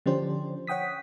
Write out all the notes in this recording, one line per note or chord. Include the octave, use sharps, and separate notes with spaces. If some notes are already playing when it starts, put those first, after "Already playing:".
D3 F3 C#4 D4 G4 C5
C#5 F#5 G5 D#6 B6